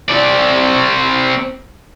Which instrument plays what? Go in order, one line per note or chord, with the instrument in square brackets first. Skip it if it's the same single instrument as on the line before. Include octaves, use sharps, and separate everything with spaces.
[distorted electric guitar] C4 D5